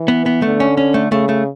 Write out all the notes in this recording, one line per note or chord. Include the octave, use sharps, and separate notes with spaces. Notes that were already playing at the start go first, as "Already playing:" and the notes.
Already playing: E3
B3
B3
D3 A3
C#4
C#4
A3
C#3 A3
A3